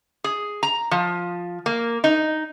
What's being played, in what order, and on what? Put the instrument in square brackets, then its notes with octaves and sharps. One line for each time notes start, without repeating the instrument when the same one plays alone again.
[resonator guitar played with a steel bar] G#4
A#5
F3
A#3
D#4